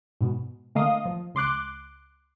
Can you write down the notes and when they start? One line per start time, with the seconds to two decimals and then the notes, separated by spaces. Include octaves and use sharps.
0.21 G#2 B2
0.75 D3 A3 A#3 D#5 F5 D#6
1.05 F3
1.34 C#2 C6 D6 F#6